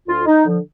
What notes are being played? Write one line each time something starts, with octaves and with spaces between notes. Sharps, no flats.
D2 F4
D#4
D3 F3